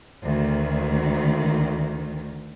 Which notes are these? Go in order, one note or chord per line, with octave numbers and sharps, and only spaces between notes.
D2 D#3